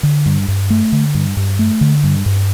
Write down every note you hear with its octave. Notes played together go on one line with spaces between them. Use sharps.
D3
G2
G2
A3
D3
G2
G2
A3
D3
G2
G2